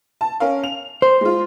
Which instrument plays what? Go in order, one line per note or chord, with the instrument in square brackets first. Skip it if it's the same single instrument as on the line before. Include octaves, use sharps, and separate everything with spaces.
[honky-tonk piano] A5
C#4 A#4 F5
F7
[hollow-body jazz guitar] C5
[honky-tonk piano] G#3 F4